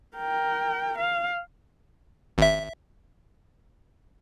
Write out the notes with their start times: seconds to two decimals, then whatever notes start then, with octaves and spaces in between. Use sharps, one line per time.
0.17 A#4 G5
0.98 F5
2.38 G#1 E5